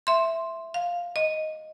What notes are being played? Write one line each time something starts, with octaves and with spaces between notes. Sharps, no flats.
E5 C6
F5
D#5